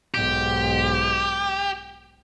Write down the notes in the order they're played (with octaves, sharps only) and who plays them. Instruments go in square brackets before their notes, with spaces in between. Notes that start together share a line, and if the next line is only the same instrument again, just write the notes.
[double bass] B1 G#2 [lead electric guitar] G4